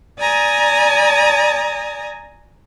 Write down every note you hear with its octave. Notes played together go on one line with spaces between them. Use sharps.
D5 G#5 A#5 D#6